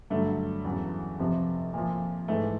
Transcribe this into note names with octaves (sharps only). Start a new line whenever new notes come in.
G2 D3 F#3 A3
E2 C#3 F#3
F2 C3 F3
A#2 F3
G#2 E3 A3